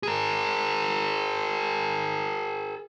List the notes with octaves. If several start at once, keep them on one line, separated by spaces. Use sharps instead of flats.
G#4 A#4